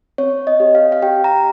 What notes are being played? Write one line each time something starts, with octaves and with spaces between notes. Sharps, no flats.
C4 C#5
D#5
G4
F5
F5
G4 G5
A#5